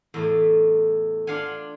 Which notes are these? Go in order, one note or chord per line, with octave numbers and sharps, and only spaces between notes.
E2 A2 A3
D4 F4 F5 F#5 G#5